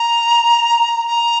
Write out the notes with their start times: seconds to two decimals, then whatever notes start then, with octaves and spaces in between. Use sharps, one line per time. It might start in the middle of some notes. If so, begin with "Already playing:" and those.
Already playing: A#5
1.07 A#5